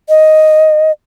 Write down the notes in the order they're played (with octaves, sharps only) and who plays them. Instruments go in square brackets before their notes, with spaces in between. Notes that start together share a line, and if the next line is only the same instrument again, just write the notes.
[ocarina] D#5